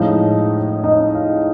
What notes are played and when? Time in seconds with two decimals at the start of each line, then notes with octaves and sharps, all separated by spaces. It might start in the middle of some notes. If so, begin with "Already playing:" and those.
Already playing: A2 F3 G#3 C#4 D#4 D#5
0.84 D#4 D#5
1.15 F4 F5